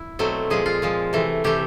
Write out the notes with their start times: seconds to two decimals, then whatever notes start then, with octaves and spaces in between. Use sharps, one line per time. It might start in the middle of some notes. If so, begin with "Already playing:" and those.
Already playing: E4
0.19 B2 F#3 A3 C4
0.50 A#2 F3 G#3 G#4
0.66 F4
0.82 A#2 F3 G#3
1.13 C3 E3 A3
1.44 C3 E3 A3 G4